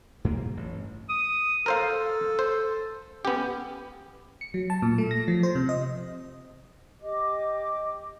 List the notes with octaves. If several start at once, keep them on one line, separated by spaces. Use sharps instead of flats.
G2 A#3
A1
D#6
A4 A#4 C5 F5
C5
B3 C#4 G4
C#7
F#3
A5
A#2
A3
A#6
F3
C5
C3
D#5
G4 D#5 D6